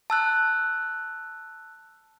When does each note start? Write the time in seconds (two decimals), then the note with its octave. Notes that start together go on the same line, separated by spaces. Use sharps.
0.10 A5 E6 F#6